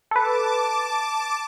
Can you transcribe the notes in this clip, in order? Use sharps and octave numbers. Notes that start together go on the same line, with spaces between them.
A4 B4 A5 D6